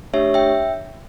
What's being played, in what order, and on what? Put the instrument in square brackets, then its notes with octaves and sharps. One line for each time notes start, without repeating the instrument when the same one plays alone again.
[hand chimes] A3 D4 G4 C#5 E5
E5 G5